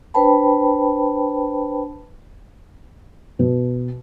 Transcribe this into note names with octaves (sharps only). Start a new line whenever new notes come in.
D4 B4 C5 G5 A5 B5
B2